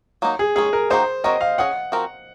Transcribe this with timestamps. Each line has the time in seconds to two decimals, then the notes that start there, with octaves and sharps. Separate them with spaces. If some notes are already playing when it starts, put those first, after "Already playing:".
0.22 F#3 A#3 D#4
0.39 G#4
0.56 D#3 G#3 C#4 G#4
0.73 A#4
0.90 D#3 A#3 D#4 F#4 C5
1.24 C4 F#4 A#4 C#5 D#5
1.41 F5
1.58 C#4 G#4 D#5 F#5
1.92 F3 C4 F#4 A#4